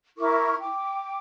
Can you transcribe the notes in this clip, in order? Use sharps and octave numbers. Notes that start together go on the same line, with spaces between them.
E4 A#4 C#6 D6
G5 D6